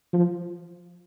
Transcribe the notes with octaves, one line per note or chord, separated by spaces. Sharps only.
F3